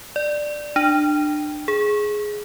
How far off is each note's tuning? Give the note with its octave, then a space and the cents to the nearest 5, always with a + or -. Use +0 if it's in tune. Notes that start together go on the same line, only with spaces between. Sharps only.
D5 +10
D4 +30
G#4 +10